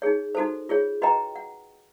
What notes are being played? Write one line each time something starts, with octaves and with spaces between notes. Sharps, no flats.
D#4 G#4 C#5
D#4 F#4 A4 C5
F4 G#4 C#5
F#4 B4 D#5 G5 A#5
F#5